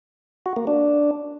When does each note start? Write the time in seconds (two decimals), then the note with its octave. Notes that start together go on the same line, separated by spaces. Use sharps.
0.46 F#4
0.56 A#3
0.67 D4